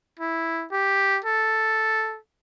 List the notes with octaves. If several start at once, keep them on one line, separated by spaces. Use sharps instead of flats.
E4
G4
A4